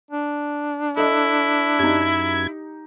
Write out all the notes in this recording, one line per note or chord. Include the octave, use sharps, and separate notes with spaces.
D4
E4 A4 D#5
F#2 D#4 G4 G#6